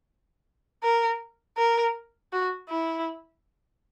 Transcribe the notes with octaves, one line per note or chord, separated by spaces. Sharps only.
A#4
A#4
F#4
E4